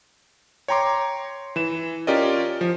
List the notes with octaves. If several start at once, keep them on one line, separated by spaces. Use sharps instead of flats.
C#5 G5 A#5 C6 D6
E3 E7
C#4 F4 G4 A#4 D5 D#5
F3